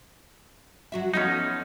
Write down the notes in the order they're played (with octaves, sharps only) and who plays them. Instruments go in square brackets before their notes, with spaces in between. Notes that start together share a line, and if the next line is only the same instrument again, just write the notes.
[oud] F#3 F#4 E5
[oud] F3 B3 A4 [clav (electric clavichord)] C#4 D#4